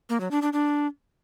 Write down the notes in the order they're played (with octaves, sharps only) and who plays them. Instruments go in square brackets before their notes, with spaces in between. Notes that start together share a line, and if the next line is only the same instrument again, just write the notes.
[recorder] A#3
F#3
D4
D4
D4